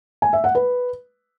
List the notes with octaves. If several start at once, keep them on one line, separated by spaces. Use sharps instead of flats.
G#5
E5
F#5
B4